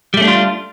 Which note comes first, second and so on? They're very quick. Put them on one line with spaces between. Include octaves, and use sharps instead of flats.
G3 A3 C#4 D4 F4